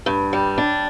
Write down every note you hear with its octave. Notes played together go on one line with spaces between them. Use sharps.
G2
G3
D4